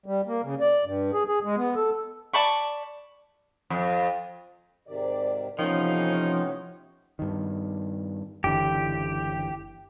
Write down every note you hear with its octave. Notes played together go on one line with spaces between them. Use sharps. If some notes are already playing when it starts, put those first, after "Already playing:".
G3
A#3
C#3
D5
G2
G#4
G#4
G#3
B3
A4
D5 A5 B5 C#6
F2
G#2 C3 D#3 D5
A2 C3 E3 F3 B3 C#4 D#4 C#5
G2 D#3
F#1 D3 E3 G4